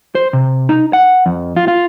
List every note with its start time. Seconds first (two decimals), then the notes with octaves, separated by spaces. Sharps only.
0.15 C5
0.33 C3
0.69 D#4
0.93 F#5
1.26 F2
1.56 F4
1.68 F4